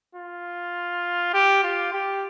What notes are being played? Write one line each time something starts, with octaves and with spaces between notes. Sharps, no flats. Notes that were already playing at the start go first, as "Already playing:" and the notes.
F4
G4
F4
G4